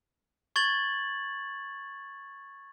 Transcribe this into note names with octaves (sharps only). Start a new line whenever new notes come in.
C#6 G#6 A6 F#7